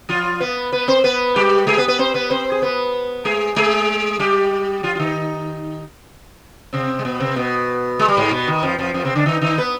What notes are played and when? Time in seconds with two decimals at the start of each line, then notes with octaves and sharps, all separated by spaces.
0.09 F3 F4
0.40 B3 B4
0.72 B3 B4
0.88 C4 C5
1.04 B3 B4
1.36 G3 G4
1.67 G#3 G#4
1.78 B3 B4
1.88 B3 B4
1.99 C4 C5
2.14 B3 B4
2.30 C4 C5
2.52 G#4
2.62 B3 B4
3.25 G#3 G#4
3.56 G#3 G#4
4.19 G3 G4
4.83 F3 F4
4.95 F4
5.00 D#3 D#4
6.73 C3 C4
6.99 G#3
7.05 B2 B3
7.20 C3 C4
7.36 B2 B3
7.99 G#3
8.08 G3
8.17 G#2 G#3
8.31 B2 B3
8.47 D#3
8.63 F2 F3
8.79 F2 F3
8.94 F2 F3
9.05 C3 C4
9.15 D3 D4
9.26 D#3 D#4
9.42 D#3 D#4
9.58 B3 B4